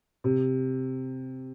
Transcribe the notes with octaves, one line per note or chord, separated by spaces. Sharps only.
C3